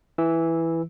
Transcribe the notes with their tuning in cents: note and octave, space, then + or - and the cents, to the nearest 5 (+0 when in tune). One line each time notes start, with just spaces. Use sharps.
E3 +0 E6 -10